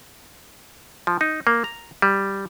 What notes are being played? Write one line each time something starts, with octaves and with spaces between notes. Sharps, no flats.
F3
D#4
A#3
A#5
G3